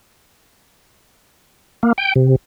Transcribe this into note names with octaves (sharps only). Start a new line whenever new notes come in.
A#3
G5
C3